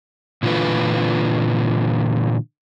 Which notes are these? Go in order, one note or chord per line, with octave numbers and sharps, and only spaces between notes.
A#2 D3 E3 F4 B4